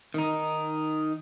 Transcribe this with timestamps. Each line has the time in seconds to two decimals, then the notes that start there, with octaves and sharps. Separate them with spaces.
0.14 D#3 D#4